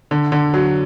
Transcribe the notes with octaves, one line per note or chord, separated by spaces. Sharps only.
D3
D3
F#3